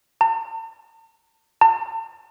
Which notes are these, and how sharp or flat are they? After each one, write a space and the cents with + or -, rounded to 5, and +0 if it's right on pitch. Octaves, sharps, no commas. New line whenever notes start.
A5 +45
A5 +40